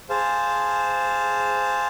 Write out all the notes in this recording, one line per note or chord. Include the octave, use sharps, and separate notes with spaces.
G#4 C5 F5 A5